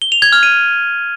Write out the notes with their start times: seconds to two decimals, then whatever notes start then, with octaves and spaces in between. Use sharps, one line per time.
0.02 G7
0.12 F7
0.22 G#6
0.32 F6
0.43 D#7